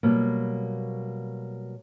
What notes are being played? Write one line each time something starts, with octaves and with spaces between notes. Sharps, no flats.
B2 F#3 G3 A#3